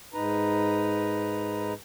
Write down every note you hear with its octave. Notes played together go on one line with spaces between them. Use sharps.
G#2 D#4 B4 A#5